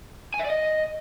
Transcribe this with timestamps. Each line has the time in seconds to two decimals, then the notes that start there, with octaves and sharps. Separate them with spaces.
0.34 G#5
0.39 E5
0.45 D5
0.50 D#5